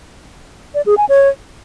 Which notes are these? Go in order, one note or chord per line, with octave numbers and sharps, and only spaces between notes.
D5
G#4
G#5
C#5